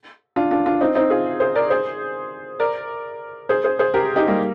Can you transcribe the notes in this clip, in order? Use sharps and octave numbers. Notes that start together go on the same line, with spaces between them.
D4 F4
D4 F4
D4 F4
C4 D#4
C4 D#4
F4 G#4
G#4 C5
A#4 D5
G#4 C5
A#4 D5
G#4 C5
G#4 C5
G#4 C5
G4 A#4
D#4 G4
G3 A#3